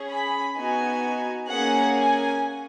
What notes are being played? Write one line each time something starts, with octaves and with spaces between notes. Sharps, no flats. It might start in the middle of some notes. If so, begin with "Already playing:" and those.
Already playing: C#4 G#4
B5
B3 D#4 F#4 G#5
A#3 C#4 G#4 F#5
G#5